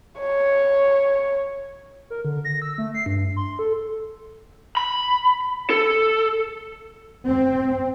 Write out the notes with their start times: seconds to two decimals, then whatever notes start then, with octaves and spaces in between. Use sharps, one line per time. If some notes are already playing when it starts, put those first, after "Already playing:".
0.20 C#5
2.10 A#4
2.25 D3
2.45 A#6
2.62 E6
2.78 A3
2.94 C7
3.06 G2
3.36 C6
3.59 A4
4.77 B5
5.70 A4
7.27 C4